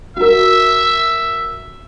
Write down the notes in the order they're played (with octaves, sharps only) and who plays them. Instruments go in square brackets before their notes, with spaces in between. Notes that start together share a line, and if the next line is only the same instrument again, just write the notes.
[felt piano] F#4 A#4 [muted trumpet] E5